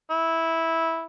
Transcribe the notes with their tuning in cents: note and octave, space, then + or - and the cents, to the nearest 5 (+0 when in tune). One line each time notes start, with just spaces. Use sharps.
E4 -10